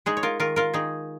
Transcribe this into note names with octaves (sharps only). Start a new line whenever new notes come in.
G#3 D#4 G#4
C#5
F4 A#4
D#3 F4 A#4
F4 A#4
D#3 D#4 G#4